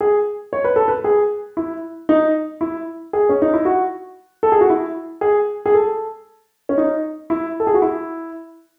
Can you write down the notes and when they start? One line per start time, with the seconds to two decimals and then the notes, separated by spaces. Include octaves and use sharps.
0.01 G#4
0.53 C#5
0.64 B4
0.76 A4
0.88 B4
1.04 G#4
1.57 E4
2.09 D#4
2.61 E4
3.13 G#4
3.29 C#4
3.42 D#4
3.53 E4
3.65 F#4
4.43 A4
4.52 G#4
4.61 F#4
4.70 E4
5.21 G#4
5.66 G#4
5.74 A4
6.69 C#4
6.78 D#4
7.30 E4
7.60 A4
7.67 G#4
7.74 F#4
7.82 E4